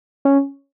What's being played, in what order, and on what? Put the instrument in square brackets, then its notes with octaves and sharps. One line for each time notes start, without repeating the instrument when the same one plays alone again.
[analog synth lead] C#4